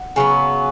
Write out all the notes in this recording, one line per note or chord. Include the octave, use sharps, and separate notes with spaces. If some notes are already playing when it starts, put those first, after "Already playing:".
Already playing: F#5
C#3 F#3 B3